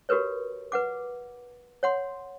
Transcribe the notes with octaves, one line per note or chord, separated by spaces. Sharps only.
F#4 G4 A#4 B4 C#5
B4 F#5 D6
C#5 F#5 C6